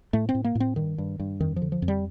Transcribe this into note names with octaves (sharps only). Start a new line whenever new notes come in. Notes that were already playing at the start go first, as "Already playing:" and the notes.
A2 A3
C4
A2
A#3
A2
C4
G2 D#3
G2
G2
F2 D#3
F3
D3
F3
F2
G3